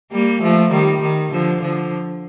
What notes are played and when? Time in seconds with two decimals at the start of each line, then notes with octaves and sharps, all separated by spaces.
0.12 G3 A#3
0.42 F3 A3
0.71 D#3 G3
1.01 D#3
1.32 D3 F3
1.61 D3 F3